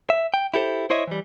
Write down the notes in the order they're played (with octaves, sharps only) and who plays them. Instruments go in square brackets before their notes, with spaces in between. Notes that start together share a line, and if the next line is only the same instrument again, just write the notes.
[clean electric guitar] E5
G5
E4 G4 A4 C5
E4 C5 C#5 D#5 E5
E3 G3